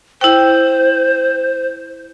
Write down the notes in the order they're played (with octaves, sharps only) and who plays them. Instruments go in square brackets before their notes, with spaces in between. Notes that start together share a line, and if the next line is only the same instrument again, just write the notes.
[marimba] E4 G5 [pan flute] C5